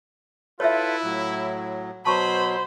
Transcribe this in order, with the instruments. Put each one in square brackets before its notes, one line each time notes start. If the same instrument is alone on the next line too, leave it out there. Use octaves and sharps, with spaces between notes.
[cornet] E4 [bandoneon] F4 A4 B4 [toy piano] C#5 E5
[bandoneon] A2 F#3
[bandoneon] B2 F#3 [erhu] C5 [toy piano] A5 C#6 [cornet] B5